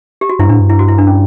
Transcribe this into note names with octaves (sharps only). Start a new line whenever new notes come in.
G4
F#4
G2 E4
A2 D4
G2
E4
F#4
E4
D4
C#4